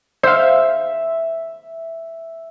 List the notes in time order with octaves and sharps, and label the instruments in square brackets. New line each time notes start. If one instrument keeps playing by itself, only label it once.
[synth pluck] C5 F5 [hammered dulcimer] E5